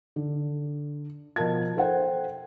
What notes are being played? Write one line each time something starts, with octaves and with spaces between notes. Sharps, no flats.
D3
B2 F3 A#4 A5 G#6
A4 C5 F#5 G5